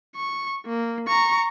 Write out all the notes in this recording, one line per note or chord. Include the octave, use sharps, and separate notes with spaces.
C#6
A#3
A#5 C#6